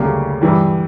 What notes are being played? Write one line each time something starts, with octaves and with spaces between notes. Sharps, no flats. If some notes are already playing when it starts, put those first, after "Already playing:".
Already playing: D2 C#3 G3 A#3
G2 E3 G3